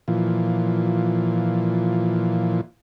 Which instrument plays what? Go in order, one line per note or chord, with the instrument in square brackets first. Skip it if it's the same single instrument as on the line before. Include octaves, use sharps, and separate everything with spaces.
[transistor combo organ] A#2 E3 F3